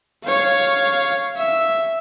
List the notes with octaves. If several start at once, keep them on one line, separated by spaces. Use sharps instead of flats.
C#5 F5
E5